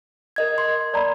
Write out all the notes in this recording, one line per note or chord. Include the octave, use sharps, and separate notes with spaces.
A#4 D#5 G#6
C6
D5 A#5 B5